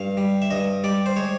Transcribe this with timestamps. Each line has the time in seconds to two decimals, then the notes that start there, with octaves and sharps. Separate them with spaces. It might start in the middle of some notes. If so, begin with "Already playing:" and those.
Already playing: G2 F5
0.17 G3
0.42 E5
0.51 G2 D#5
0.84 G3 D5
1.06 C5
1.16 G#3 C#5